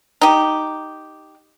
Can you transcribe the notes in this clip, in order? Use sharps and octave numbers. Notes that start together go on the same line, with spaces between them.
D#4 G4